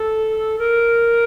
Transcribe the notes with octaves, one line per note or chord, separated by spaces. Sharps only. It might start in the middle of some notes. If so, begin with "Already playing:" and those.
Already playing: A4
A#4